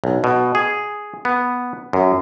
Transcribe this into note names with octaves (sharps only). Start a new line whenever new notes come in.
B1
B2
G#4
B3
F#2